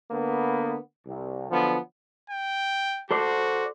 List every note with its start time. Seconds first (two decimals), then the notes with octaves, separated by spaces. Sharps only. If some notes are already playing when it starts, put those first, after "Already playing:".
0.11 D3 A#3 B3
1.06 C2
1.50 D3 F3 F#3 B3
2.30 G5
3.11 F#4 A4 C5 D5